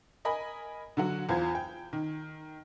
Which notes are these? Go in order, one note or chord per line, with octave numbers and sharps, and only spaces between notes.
A#4 D#5 G#5 B5
D3 F#3 F#4
E2 F4 C5 G#6
G5
D#3